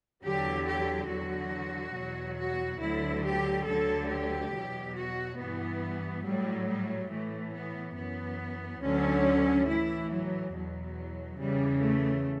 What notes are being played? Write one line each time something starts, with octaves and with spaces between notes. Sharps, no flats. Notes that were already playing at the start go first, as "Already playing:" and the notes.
E2 D3 F#3 G4
G4
E2 D3 F#3 F#4
E2 B2 F#3
F#4
D2 D3 F#3 E4
G4
D2 D3 F#3 A4
G4
E2 B2 F#3
F#4
G2 E3 B3
A2 F#3 G3
G3
A2 E3 A3
B3
F#2 E3 B3
D2 D3 F#3 C#4
A2 E3 E4
F#3
E2 B2 F#3
E2 C#3 E3 G3
A3